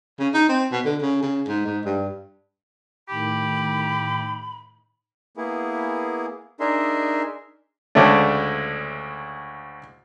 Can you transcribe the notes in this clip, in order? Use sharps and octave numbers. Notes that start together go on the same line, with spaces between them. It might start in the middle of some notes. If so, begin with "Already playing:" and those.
C#3
D#4
C4
B2
D3
C#3
C#3
G#2
G#2
G2
A2 D#3 G4 B5
A#3 B3 E4 G#4
D4 D#4 G#4 A#4 E5 C6
D2 C#3 G#3 A3 D4